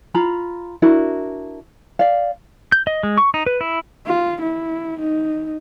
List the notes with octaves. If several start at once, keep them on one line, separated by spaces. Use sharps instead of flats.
F4 A#5 B5
D4 E4 F#4 A#4
D5 F5
G6
D#5
G#3
C#6
D#4
B4
E4
F4
E4
D#4